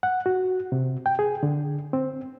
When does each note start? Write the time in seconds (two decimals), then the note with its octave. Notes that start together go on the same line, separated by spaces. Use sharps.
0.03 F#5
0.26 F#4
0.72 C3
1.06 G5
1.19 G#4
1.43 D3
1.93 C4